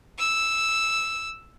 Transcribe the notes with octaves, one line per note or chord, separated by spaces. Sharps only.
E6